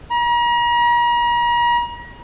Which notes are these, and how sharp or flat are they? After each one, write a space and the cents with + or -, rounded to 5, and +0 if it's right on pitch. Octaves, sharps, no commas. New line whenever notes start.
A#5 +40